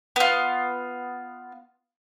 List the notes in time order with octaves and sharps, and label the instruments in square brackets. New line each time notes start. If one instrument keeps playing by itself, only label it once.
[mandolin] B3 F4